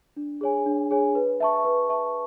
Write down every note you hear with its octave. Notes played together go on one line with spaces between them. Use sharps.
D4
G#4 C#5 G#5
D4
G#4 C#5 G#5
B4
E5 A5 C#6
B4
E5 A5 C#6